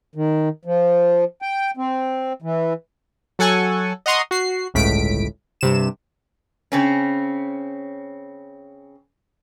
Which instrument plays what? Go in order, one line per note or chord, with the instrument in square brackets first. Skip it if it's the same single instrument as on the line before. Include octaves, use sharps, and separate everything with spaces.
[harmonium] D#3
F3
G5
C4
E3
[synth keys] F#3 A4 F#5 G#5 C#6
D#5 F#5 A#5 C6 C#6 D#6
F#4 C7
G1 C#2 A2 B6 D7
G2 C3 E7
[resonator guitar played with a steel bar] C#3 C4 C#4